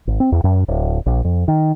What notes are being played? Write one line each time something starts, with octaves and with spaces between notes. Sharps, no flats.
G#1
C4
E2
F#2
D1
A#1
F2
D#3